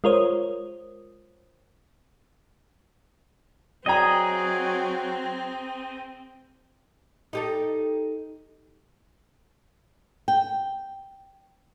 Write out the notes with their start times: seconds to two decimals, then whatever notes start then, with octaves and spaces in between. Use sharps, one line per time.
0.04 G#3 F4 A#4 C5 C#5 D#6
3.86 F#3 C4 G#4 D5 D#5 G5 A#5
7.33 D#4 G4 A4
10.28 G5